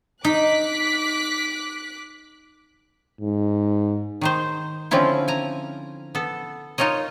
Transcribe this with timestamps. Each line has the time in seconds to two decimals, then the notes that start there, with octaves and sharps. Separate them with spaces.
0.24 D#4 D6 F#6 B6
3.21 G#2
4.21 D#3 D#4 C5
4.91 D3 F3 C4 C#4 E4 F4
5.28 G#5 A#5
6.15 B3 A4
6.78 D#4 F4 A#4 C#5 D#5